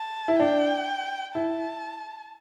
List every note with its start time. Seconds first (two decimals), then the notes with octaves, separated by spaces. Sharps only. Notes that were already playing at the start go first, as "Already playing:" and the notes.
Already playing: A5
0.28 E4
0.39 D4 G5
1.35 E4 A5